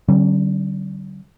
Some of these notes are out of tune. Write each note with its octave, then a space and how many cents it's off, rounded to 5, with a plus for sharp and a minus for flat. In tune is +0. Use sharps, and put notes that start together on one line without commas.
D3 +0 G3 -45 C#4 -40